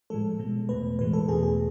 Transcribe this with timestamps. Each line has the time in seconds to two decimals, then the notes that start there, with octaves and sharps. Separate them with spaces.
0.10 A2 F3 G#3 A4
0.39 B2 G#3
0.69 E2 B2 A3 B4
0.99 A2 E3 G#3 B4
1.13 A4
1.28 E2 B2 A3 G#4
1.43 G#4